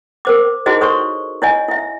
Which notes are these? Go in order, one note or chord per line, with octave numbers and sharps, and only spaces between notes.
A#4 C5 D6
D#4 E4 F#4 G#4 C5 D#5
A4 C5 C#5 C6 C#6
E4 C#5 D#5 G#5
E4 E5